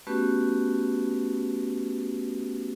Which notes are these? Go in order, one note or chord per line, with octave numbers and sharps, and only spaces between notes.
A3 B3 C#4 F#4 G4 B4